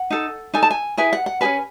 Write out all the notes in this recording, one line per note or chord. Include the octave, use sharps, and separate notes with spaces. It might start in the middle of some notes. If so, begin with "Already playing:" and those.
Already playing: F#5
D#4 A4
D#4 A4 G#5
A5
G#5
E4 G#4 B4 G#5
F#5
F#5
C#4 G#4 B4 G#5